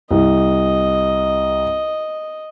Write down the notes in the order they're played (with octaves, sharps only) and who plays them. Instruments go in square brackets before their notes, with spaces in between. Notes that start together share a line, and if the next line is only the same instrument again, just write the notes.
[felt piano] C2 [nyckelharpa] D#5